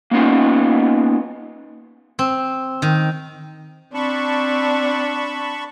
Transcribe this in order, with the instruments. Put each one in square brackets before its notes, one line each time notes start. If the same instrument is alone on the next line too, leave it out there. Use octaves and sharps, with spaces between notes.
[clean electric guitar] A#3 B3 C#4 D#4 F4
[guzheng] C4
D#3
[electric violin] C4 [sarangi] D4 [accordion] A5 B5 C#6